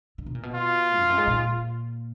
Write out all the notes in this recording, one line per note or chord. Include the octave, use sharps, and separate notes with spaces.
D3
B2
A#2
B2
F4
F2
F#2
G#2
A#2